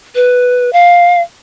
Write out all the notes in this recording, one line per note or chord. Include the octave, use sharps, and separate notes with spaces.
B4
F5